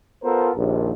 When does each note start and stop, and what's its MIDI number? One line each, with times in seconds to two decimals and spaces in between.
0.23 0.50 59
0.23 0.50 65
0.23 0.50 69
0.23 0.50 70
0.23 0.50 72
0.54 0.91 34
0.54 0.91 39